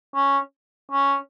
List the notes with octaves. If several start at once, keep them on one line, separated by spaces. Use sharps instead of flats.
C#4
C#4